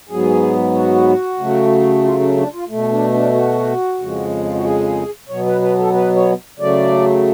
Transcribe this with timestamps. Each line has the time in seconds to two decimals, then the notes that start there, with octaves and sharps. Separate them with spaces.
0.09 G#2 F#3 B3 G#4
0.75 F#4
1.39 C#3 F#3 A3
2.04 F4
2.20 C#4
2.37 D4
2.53 F4
2.69 B2 A3
2.91 D4
3.13 D4
3.34 F#4
3.99 F2 C#3 F3 G#3
4.44 F4
4.54 F#4
4.65 G#4
5.29 B2 F#3 B3 C#5
5.46 B4
5.62 B4
5.78 A4
5.94 B4
6.16 C#5
6.59 C#3 F#3 A3 D5